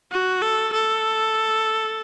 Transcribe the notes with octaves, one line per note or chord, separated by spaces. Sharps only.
F#4
A4
A4